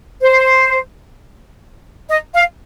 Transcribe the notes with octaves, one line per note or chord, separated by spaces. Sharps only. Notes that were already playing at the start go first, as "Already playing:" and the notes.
C5
D#5
F5